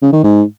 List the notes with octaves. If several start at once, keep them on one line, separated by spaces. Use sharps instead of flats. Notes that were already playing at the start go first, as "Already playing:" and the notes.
C#3
D#3
G#2